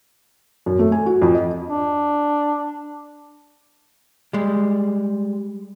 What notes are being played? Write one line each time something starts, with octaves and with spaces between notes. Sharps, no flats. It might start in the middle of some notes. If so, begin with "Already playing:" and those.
F#2
A3
G#5
F#4
F2
D#5
D4
G3 G#3